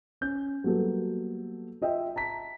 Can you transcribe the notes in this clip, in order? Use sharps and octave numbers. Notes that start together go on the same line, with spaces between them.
C#4 G6
F#3 G3 A#3 B3 A4
F4 D#5 E5 G5
A5 A#5 B6